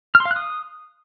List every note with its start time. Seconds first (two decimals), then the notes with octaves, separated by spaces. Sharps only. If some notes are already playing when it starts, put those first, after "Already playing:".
0.15 F6
0.20 C6
0.25 F5
0.31 F#6
0.36 D#6